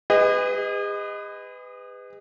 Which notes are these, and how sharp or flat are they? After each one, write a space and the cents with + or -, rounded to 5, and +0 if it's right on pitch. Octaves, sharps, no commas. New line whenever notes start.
G#4 -40 B4 +25 D#5 +0